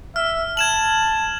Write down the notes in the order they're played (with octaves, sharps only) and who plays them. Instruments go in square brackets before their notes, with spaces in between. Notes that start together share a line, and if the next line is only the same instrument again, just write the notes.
[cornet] E5 [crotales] F6
[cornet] A5 [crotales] G#6 E7 F#7